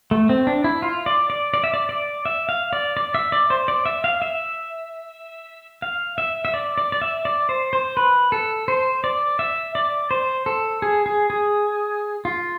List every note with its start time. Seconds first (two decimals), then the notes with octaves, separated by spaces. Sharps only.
0.11 A3
0.29 C4
0.47 D4
0.64 E4
0.82 F4
1.06 D5
1.30 D5
1.54 D5
1.64 E5
1.74 D5
1.89 D5
2.25 E5
2.49 F5
2.73 D5
2.97 D5
3.15 E5
3.32 D5
3.50 C5
3.68 D5
3.86 E5
4.04 F5
4.22 E5
5.82 F5
6.18 E5
6.45 E5
6.54 D5
6.78 D5
6.92 D5
7.02 E5
7.25 D5
7.49 C5
7.73 C5
7.97 B4
8.32 A4
8.68 C5
9.04 D5
9.39 E5
9.75 D5
10.11 C5
10.46 A4
10.82 G#4
11.06 G#4
11.30 G#4
12.25 F4